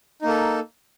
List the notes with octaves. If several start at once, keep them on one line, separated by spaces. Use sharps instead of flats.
A#3 D#4 A4